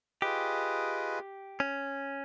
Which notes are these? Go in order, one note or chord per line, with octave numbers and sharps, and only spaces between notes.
F4 G4 G#4 B4 D#5
C#4